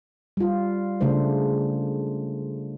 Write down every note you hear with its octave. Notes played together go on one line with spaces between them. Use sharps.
G3 F4
C#3 A3 D4 C5